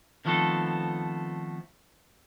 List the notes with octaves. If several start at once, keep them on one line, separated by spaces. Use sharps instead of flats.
D#3 F3 A3 B3 C4 A4